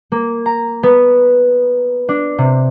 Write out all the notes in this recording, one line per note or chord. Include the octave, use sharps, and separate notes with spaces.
A#3
A#5
B3
D4
C3